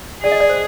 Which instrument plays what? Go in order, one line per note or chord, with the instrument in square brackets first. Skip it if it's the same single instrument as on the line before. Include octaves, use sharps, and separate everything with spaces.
[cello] G#4 [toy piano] D5
[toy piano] D#5
D5
C5